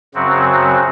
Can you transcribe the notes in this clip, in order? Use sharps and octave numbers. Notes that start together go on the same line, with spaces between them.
F#2 C#3 F#3 C4 F#4